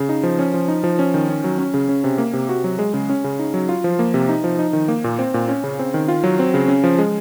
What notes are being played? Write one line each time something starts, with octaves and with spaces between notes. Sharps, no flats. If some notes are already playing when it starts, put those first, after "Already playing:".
Already playing: C#3
D#4
F3
C#4
F3
D#4
F3
C#4
D#3
C#4
F#3
C#4
C#3
C#4
C3
A#3
C3
F#4
F#3
G#3
C#3
C#4
C#3
D#4
F#3
F4
F3
A#3
C3
D#4
F3
D#4
D#3
A#3
A#2
C4
A#2
C#4
C#3
C4
D#3
F4
F#3
C4
C#3
C#4
F3
G#3